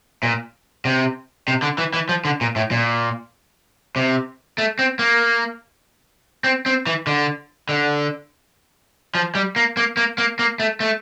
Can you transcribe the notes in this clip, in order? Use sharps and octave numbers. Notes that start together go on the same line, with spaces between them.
A#2
C3
C3
D3
E3
E3
F3
D3
A#2
A2
A#2
C3
A3
C4
A#3
C4
C4
E3
D3
D3
F3
G3
A#3
A#3
A#3
A#3
A#3
A3
A3